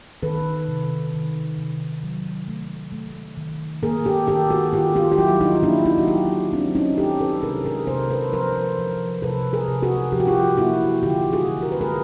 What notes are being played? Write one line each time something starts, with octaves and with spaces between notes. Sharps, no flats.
D#3 A4 B4
C3
D#3
C3
F#3
A3
A3
D#3
A#3 G#4 A#4
G4 A4
D#3 G4 A4
F#4 G#4
D#3 F4 G4
F4 G4
G4
F#3 E4 F#4
D#4 F4
A#3 D4 E4
D#4 F4
F#4
F#3 F4 G4
F#3 C4 D4
C#4 D#4
D#3 G4 A4
A4 B4
C3 G#4 A#4
G#4 A#4
C3 A#4 C5
A4 B4
F3 A#4 C5
F3
C3 A4 B4
G#4 A#4
C3
F#4 G#4
F3 G4
F#4
F4 G4
A#3 E4 F#4
D3 F4 G4
F#4 G#4
D3
A#4
B4
G#4 A#4